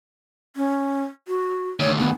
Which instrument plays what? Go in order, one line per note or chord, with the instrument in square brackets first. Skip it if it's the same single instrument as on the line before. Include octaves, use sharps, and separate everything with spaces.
[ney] C#4
F#4
[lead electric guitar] D2 D#3 [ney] C#5
[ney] B3